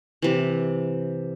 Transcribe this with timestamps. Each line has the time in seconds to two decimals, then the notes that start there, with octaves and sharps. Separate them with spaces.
0.22 C3 E3